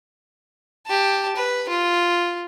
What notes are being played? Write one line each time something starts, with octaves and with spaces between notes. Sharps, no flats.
G4 A5
B4
F4